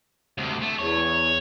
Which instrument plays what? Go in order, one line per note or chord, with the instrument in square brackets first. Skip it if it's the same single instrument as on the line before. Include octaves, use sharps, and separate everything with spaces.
[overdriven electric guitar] D2 C3
A3
[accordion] E2 [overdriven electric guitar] C#5